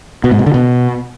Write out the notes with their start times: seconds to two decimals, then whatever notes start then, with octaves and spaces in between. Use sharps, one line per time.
0.24 B2
0.31 G#2
0.39 B2
0.46 D3
0.54 B2